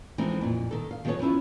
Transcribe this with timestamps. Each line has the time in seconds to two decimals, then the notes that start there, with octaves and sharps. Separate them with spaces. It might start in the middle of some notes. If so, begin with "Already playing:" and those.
0.18 E3 F3 G#3 A3 C4 D#4
0.41 F2 A#2
0.71 D#3 A4
0.91 F5
1.05 D#3 F3 B3 G#4 A4 C#5
1.19 F3 B3 C#4 E4 F4